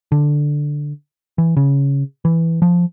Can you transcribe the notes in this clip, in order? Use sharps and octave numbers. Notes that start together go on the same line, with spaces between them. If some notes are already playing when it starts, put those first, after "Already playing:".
D3
E3
C#3
E3
F3